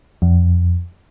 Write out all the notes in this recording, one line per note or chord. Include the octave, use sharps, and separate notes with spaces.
F2